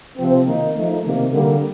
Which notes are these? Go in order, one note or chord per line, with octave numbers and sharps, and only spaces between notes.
C3 F3 C4
D#3 A#3 D#4
F3 A3 D#4
C3 D#3 A#3
D3 G3 A#3